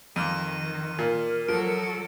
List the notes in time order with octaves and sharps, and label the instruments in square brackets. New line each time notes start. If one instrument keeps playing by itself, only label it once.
[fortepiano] F2 [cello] D#3 [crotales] D6 F6 D#7
[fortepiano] A#2 [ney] A#4
[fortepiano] F3 [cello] F#3 A4 [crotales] D7